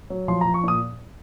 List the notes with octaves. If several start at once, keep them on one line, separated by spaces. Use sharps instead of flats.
F#3
F3 C6
F3 A#5
C#6
A#2 D#6